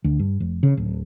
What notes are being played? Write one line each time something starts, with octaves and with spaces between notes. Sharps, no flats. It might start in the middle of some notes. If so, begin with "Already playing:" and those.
D2
G2
F1
C#3
D1